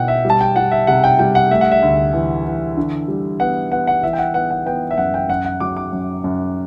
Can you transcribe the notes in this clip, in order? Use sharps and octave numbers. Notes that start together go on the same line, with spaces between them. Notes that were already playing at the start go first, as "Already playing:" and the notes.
Already playing: B2 E4 F#5 G5
E5
G3
A5
G5
G3 F#5
E5
C3 F#5
G5
G3 G5
F#5
A3 E5
F#5
E5
D2
E3
E3
D3
G3
B3 F#5
B3 F#5
F#5
E3 E5
G5
F#5
B3 F#5
F#5
B3 G5
E5
F#2 F#5
G5
F#2 F#5
F#5
F#3 D6
D6
F#2
F#2